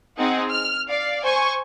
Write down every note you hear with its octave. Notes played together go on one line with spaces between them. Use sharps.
C4 D#4 G#4 F#5
F6
D5 F5
C5 G#5 C#6